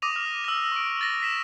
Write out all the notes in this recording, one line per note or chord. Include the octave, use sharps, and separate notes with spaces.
D6 D#6 A#6 D#7 F7
F6
E6 A#6
C#6 D7
A6 A#6
B6 E7